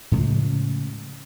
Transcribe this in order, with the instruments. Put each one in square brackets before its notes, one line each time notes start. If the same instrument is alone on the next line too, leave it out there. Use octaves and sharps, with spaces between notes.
[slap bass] A2 C#3 F3 G#3